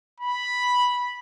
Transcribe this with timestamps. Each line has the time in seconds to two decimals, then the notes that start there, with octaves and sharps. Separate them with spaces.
0.20 B5